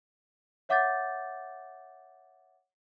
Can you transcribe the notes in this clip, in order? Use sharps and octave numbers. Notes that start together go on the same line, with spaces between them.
C#5 E5 F#5 D6 G6 A6